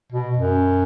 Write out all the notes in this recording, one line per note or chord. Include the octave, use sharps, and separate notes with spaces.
B2
F#2